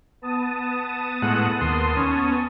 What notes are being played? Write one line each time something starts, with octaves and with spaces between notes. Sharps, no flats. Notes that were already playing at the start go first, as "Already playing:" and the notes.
B3 A5 D#6
A2 G#3 F#5
D#2 C6
C#4